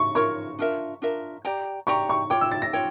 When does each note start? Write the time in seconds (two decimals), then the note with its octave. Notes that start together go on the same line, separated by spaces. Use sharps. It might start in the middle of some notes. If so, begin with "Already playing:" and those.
Already playing: C#6
0.15 F4 A#4 C#5 C#6
0.59 D4 F4 A#4 E5
1.02 D4 F4 A#4 E5
1.45 G4 D5 G5 A#5
1.87 G4 D5 G5 A#5 C#6
2.09 C#6
2.30 F4 C#5 G5 D6
2.41 E6
2.52 A6
2.62 A#6
2.73 F4 C#5 G5